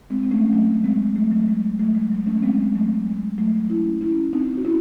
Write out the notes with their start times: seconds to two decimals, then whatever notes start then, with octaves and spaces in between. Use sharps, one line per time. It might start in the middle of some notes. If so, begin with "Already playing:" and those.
0.10 G#3 C4
0.23 C4
0.31 A3 C#4
0.52 F#3 A3
0.84 G#3 C4
1.16 F#3 A3
1.31 F#3 A3
1.48 G#3
1.79 F#3 A3
1.95 G#3
2.12 F#3
2.26 A3 C#4
2.43 G#3 C4
2.74 F#3 A3
3.06 G#3
3.38 F#3 A3
3.70 C#4 E4
4.01 C#4 E4
4.33 C4 D#4
4.57 F#4
4.65 C#4 E4